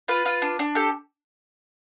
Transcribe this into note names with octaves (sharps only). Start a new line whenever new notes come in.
F4 B4
F4
D4
D4
G4 A4